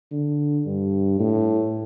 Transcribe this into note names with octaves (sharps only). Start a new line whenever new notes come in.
D3
G2
A2